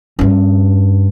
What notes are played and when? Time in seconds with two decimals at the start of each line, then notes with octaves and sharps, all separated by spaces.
0.19 G2 C#4